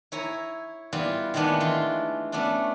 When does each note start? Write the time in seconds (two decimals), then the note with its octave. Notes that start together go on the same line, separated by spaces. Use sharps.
0.12 E4 C#5 G#5 A#5
0.93 E3 G3 B3 F4
1.34 D#3 E3 G#3 A3 B3 D4
1.60 E3 F4 C6
2.32 A3 B3 C#4 D4